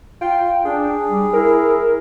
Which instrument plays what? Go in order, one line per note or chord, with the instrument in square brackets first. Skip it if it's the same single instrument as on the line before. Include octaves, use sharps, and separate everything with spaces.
[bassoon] F4 [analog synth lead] G5
[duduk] D4 [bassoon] G#4
[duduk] G3
[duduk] E4 [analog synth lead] A#4